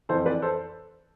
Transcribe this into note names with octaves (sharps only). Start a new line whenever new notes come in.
F2 E3 A4 C5
B4 D5
A4 C5